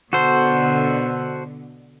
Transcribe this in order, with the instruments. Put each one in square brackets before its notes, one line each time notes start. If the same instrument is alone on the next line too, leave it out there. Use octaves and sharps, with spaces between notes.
[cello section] B2 D3 [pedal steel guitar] F#4 A4 C5